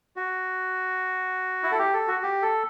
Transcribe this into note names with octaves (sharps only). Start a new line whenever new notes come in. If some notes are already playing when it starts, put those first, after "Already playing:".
F#4
E4
A4
G4
A4
F#4
G4
A4